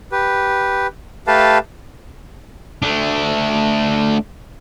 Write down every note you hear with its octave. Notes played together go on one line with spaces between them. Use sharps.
G4 B4
A3 G4 A4 B4 F5 A5
A3 D4